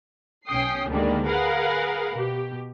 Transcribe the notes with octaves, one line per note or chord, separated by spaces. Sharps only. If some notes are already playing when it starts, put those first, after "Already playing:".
B1 C#4 G5 D#6 C7
D2 G#2 D3 D#3 G3 A#3
G#4 A#4 B4 F5 F#5
B2 G4